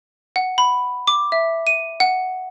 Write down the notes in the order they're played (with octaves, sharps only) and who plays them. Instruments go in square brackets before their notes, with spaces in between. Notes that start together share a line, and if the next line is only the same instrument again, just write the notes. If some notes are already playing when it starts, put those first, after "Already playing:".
[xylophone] F#5
B5
D6
E5
D#7
F#5